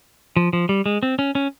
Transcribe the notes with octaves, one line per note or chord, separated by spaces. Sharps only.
F3
F3
G3
G#3
C4
C#4
C#4